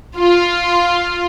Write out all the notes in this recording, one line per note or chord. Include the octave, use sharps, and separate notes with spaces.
F4